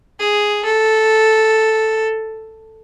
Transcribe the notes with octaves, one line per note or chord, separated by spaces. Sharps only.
G#4
A4